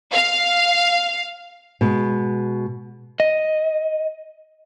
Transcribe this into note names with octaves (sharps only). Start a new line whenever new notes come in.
F5
B2 G#3
D#5